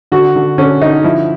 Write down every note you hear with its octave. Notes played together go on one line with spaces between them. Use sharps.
D3 F#4
D3
D3 C#4
D3 D#4
F3 E4